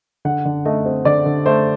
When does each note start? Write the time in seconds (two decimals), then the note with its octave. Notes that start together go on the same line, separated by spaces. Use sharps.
0.25 D3 F#5
0.45 D3
0.65 A3 D#5
0.86 C4
1.05 D3 D5
1.26 D3
1.46 A3 C5